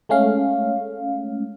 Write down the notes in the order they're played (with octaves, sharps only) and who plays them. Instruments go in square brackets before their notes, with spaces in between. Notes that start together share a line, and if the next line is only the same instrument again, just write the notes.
[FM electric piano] G#3 A3 C#4 F5